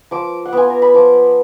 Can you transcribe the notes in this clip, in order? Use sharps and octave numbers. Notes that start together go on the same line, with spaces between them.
F3 D6
F#5
B3 F4 G#5
A#5
B5
F3 D6